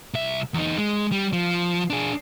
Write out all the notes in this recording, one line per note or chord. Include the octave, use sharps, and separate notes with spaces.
C2 E5
E2 D#4
G#3
G3
F3
D4 G#4